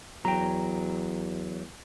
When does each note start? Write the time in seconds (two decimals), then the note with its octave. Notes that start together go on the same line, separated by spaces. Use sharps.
0.25 E2 F#3 G5 A#5